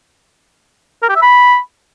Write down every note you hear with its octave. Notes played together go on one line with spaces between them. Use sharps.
A#4
G4
E5
B5